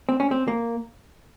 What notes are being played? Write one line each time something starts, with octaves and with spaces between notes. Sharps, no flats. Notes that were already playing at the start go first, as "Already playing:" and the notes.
C4
C#4
C4
A#3